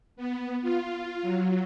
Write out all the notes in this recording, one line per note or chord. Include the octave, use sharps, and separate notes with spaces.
B3
F4
F#3